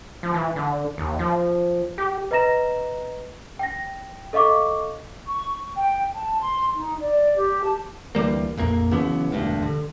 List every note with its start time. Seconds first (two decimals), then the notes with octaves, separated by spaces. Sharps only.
0.23 F3
0.34 E3
0.56 D3
0.98 D#2
1.19 F3
1.98 G4
2.31 B4 D#5 A#5 A#6 E7
3.59 G5 A#6
4.33 A4 D#5 F5 C#6 D6
5.27 C#6
5.75 G5
6.15 A5
6.40 C6
6.75 D#4
7.01 D5
7.36 G4
7.63 A5
8.15 D2 E3 G3 A#3
8.57 A#1 F2 A#3
8.91 C#3 E3 F#3 B3
9.31 E1 D2 G2
9.63 D3